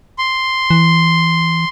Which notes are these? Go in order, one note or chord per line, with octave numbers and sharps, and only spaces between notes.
C6
E3